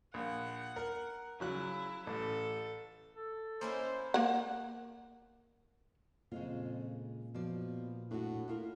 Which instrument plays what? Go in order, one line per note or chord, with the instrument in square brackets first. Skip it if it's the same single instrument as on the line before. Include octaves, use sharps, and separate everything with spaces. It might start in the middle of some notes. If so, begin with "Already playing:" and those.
[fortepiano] A#1 [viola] F#5
[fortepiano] A#4
[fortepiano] C#3 F#3 F#6 [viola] E4
[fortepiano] A1 [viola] A4
[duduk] A4
[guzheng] A#3 C#4 E4 [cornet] C5 [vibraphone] C#5 D#5 B5
[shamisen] A#3 F#5
[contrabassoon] F2 [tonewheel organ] A#2 [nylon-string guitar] C#3 G#3 F4
[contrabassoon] B2 [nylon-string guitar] F3 D5
[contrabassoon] A2 [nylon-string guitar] D4 F#4
[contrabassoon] A2 [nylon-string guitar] E4 F4 A#4